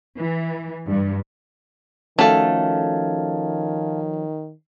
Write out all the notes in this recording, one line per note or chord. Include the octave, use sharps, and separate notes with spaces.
E3
G2
D#3 F3 A3 C#4 F#4 A4 F5 A5